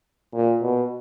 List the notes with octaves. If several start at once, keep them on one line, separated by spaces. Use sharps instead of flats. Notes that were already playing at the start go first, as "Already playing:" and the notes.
A#2
B2